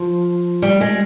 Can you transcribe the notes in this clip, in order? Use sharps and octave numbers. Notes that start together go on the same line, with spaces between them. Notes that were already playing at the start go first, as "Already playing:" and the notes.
Already playing: F3
G3
G#3